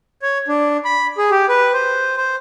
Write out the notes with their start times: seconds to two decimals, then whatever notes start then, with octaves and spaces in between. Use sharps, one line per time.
0.22 C#5
0.48 D4
0.85 B5
1.18 G#4
1.31 G4
1.49 B4
1.73 C5
2.17 C5